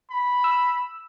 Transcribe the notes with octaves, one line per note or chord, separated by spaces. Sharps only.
B5
E6